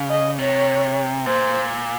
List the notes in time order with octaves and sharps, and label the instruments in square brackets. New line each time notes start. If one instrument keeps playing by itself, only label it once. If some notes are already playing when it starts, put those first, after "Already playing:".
Already playing: [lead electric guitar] C#3
[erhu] D#5
[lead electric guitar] C3 [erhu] C#5
[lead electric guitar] A#2 [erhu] C5